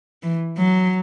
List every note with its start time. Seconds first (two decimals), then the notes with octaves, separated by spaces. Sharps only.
0.23 E3
0.58 F#3